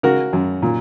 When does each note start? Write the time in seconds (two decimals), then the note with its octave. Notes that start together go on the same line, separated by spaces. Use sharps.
0.03 C#3 F#4 A#4
0.33 F#2
0.62 A#2